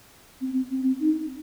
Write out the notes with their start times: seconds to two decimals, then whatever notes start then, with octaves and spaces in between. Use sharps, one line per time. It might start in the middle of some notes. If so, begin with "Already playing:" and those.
0.41 C4
0.71 C4
1.00 D#4